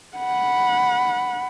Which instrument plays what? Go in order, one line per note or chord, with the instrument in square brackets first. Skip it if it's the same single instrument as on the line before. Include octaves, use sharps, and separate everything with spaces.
[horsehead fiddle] F#5 B5